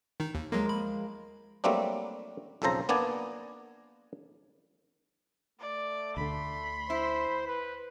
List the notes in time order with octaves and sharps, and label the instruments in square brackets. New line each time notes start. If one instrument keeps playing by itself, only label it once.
[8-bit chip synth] D#3 D#4
D#2
[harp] F3 G#3 A#4 [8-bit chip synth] F#3 A#3
[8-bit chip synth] B5
[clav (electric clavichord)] F#3 G3 A3 A#3 C4 D4
B1 F2 C#3 A4 C5 A#5
A#3 B3 D4 D5 G#5
[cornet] A3 [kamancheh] D5
[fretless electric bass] D2 D3 [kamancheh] B5 C6
[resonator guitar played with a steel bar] E4 [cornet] C5
[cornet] B4